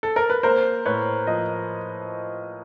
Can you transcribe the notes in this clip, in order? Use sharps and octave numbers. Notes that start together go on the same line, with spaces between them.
A4
A#4
B4
A#3 A#4 C5
A2 B4 C#5
F3 D#5